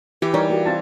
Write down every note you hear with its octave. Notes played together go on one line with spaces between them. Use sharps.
E3 G4 B4
G3 D#4 A#4 C#5
A#3 F#4 G4
C4 F4 A5